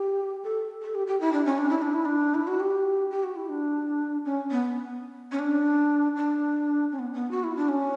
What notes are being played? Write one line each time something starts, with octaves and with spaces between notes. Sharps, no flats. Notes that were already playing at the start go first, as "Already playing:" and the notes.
Already playing: G4
A4
A4
G4
G4
E4
D4
C#4
D4
E4
D4
E4
D4
E4
F#4
G4
G4
F#4
E4
D4
C#4
B3
C#4
D4
D4
C#4
B3
B3
F#4
E4
D4
C#4